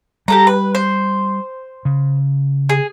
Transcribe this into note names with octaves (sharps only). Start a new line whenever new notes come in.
G3 G4 A4 A#5
B4
C5
C#3
G#4